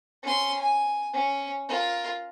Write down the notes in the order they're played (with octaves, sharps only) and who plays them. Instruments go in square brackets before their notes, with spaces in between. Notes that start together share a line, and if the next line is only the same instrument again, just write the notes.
[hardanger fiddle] C#4 C6
G#5
C#4
F4 A#4